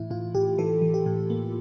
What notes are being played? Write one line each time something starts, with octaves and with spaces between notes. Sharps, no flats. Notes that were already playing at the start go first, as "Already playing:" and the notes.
Already playing: A2 E3 E4
A2 F4
A2 G4
E3 A4
E3
G4
A2
A#3